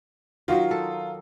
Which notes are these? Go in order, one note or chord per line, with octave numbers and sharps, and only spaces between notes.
D#3 F#3 D#4 F4
A4